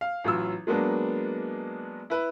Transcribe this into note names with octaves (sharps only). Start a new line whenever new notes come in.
F5
A1 F#3 F4 E6
F#3 G#3 A#3 B3 D4
E4 B4